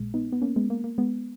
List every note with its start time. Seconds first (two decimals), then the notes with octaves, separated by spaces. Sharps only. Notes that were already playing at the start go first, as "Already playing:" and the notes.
Already playing: A#1 A#2 G#3
0.14 B3 D#4
0.33 B3
0.42 A#3 C#4
0.56 G#3 B3
0.70 A#3
0.84 A#3
0.98 G#3 B3